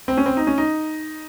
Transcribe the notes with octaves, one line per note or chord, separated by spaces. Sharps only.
C4
C#4
C4
D#4
C#4
D#4